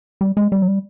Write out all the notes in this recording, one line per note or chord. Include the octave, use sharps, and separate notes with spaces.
G3
G#3
G3
F#3
G3